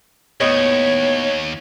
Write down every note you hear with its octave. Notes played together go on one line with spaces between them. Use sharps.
D#2 A2 B3 C#5 D#5